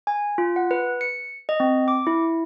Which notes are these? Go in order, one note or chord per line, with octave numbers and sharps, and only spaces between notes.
G#5
F4
F#5
B4
C#7
D#5
C4
D6
E4